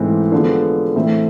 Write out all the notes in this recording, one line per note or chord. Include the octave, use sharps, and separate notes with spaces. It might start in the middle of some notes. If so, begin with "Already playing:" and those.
Already playing: G#2 E3 A3 C4
D3 F3 G#3 B3
A2 E3 A3 C4 E4